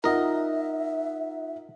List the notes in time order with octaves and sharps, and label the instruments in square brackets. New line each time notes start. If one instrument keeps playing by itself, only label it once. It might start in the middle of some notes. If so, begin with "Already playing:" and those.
[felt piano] D#4 F4 F#5 [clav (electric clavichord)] A#4 D#5 [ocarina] E5